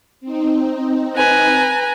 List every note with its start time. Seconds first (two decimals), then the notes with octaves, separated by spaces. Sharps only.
0.21 C4 D#4
1.16 B4 G#5 A#5